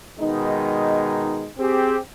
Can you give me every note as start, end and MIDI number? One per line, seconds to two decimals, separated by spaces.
0.20 1.47 47
0.20 1.47 51
0.20 1.47 56
0.20 1.47 63
1.58 1.97 60
1.58 1.97 67
1.58 1.97 68